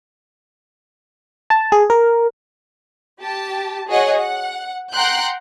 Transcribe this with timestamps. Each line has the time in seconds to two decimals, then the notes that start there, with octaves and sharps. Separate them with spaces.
1.50 A5
1.72 G#4
1.90 A#4
3.21 G4 A5
3.89 F#4 G#4 C#5 D#5 F#5
4.17 F#5
4.93 F#5 G5 A#5 C6 F#6 G6